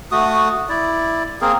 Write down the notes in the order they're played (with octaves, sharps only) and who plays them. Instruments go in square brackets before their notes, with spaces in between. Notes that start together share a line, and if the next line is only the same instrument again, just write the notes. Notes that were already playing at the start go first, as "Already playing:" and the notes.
[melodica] A3 F#4 D#6
E4 D5
A#3 C4 G#4 A#4